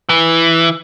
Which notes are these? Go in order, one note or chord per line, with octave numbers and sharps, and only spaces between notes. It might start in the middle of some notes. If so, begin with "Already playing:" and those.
E3